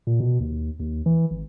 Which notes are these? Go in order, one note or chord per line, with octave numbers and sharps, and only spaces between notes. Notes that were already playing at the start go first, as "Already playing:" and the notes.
A#2
B2
D#2
D#2
E3
G#1